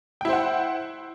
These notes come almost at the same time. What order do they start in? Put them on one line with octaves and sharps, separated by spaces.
G5 E4 C5 F#5